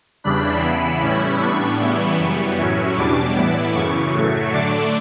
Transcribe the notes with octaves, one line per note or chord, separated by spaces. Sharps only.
E2 C#3 E3 G3 D4 B5
C#3 E3 B3 E4 B5
A2 E3 G3 C#4 E4
A2 G3 B3 D4 C#6
C#3 E3 G3 B3 E4
F#2 E3 G3 B3 C#6
A2 F#3 C#4 E4
E2 B2 G3 D4 D6
A2 E3 B3 E4
F#2 C#3 E3 C#6
A2 F#3 A3
D3 A3 D4 D6